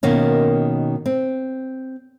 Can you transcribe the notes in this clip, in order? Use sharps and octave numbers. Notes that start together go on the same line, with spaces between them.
B2 D#3 A#3 C#4
C4